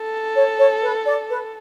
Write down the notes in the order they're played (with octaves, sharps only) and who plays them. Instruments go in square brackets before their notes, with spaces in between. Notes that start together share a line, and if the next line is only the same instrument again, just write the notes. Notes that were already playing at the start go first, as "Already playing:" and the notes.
Already playing: [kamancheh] A4
[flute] C#5
C#5
B4
D5
B4